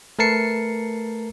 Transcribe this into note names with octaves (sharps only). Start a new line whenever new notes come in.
A3 A#4 B4 A5 C7 C#7